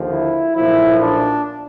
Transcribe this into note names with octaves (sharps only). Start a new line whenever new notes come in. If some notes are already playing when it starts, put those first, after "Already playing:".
Already playing: D#2 D3 F3
E4
B1 A#2 F3 E4
D4